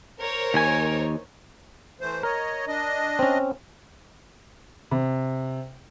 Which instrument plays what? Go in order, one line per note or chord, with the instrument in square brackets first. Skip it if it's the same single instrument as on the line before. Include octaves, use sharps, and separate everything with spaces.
[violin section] A#4 C5 C#5
[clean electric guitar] D#2 G#5
[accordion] E3 A3 C5
[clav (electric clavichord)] A#4 [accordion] C#5 D#5
[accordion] D4 D#5
[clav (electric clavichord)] C4 C#4
[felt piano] C3